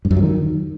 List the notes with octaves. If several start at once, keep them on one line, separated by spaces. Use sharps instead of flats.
G2
F#2
F#3
D#3